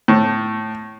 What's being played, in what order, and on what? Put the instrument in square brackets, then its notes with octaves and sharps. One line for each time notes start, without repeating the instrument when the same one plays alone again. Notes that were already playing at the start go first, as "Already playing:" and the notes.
[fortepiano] A2